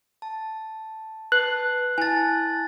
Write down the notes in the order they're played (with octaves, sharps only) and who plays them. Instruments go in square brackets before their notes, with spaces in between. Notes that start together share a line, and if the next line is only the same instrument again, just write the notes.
[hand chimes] A5
[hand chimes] B4 A5 C7 [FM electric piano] F#6
[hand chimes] E4 A5 [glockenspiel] G#5 A6